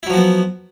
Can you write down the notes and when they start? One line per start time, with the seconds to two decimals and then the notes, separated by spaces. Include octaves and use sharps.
0.03 E4
0.06 F#3
0.10 F3
0.13 F#4
0.17 B3